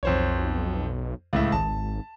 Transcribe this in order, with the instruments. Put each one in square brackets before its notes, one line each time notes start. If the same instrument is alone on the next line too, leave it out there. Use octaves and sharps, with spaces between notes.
[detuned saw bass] B1 [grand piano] F2 C5 C#5
[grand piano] C#2 A2 E5
[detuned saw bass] G#1 [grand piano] A5